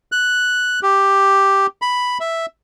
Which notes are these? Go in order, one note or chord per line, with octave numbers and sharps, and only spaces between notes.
F#6
G4
B5
E5